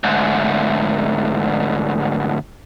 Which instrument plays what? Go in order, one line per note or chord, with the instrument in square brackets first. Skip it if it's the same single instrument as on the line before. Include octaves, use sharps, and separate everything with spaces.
[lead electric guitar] D2 G#2